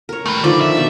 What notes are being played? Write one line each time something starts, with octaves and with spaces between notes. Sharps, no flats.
A#4 C#5
A3 B4 G5
D3 D#3 F3 D5
E5
B2 A5